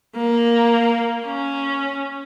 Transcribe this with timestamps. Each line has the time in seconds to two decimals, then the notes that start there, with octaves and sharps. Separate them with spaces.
0.15 A#3
1.25 C#4